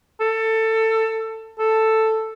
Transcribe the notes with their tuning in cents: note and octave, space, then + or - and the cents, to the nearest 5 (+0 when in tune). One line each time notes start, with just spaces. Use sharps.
A4 +20
A4 +5